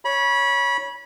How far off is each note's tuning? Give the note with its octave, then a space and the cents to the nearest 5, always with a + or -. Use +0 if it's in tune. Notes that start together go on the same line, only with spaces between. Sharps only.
C#5 +0 B5 -25